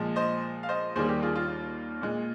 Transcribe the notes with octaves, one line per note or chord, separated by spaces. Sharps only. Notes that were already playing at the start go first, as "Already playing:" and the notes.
Already playing: A#2 F3 G#3
C5 D#5
F5
C5 D#5
D#2 D#3 G3 A#3 G#4 C5
G4
F4 G#4
F4
A#2 G#3